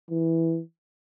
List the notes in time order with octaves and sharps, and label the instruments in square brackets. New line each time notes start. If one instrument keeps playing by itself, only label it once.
[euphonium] E3